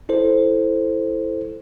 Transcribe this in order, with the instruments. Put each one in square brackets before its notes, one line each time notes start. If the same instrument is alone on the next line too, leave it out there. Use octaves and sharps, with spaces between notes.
[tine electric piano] E4 A4 C5